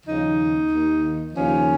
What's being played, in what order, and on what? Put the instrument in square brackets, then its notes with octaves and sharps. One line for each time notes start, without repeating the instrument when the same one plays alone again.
[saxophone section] D#2 C#3 F3 D#4
D#2 D#3
D#2 C#3 F3 C#4